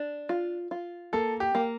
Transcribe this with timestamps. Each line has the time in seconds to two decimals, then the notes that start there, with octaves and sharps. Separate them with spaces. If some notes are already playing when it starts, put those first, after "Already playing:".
Already playing: D4
0.29 F4
0.71 F4
1.13 A#3 A4
1.40 G4
1.55 A#3